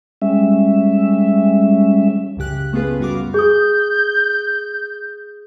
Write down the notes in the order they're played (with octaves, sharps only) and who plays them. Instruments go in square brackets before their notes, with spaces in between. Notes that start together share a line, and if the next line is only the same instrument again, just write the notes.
[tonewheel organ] G3 G#3 C#4 E5
[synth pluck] C#2 F#2 C#3 G4 F#6
A3 B3 C#4 F4 G#4 B4
F#2 G3 F4 F#4 F5 D6
[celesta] G#4 D#6 [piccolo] G6